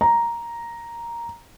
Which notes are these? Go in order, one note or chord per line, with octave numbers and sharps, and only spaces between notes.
A#5